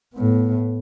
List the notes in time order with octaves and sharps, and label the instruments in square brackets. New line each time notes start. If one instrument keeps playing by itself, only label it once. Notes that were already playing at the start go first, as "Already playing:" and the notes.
[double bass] A2 B3